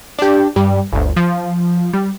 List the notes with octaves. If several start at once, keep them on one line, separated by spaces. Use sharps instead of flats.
D4 G4
G2 G3
G1 D2
F3
G3